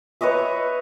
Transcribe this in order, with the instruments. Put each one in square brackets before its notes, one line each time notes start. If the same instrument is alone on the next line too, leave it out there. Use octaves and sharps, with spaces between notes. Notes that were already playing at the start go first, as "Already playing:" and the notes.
[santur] B4 C#5 D#5 E5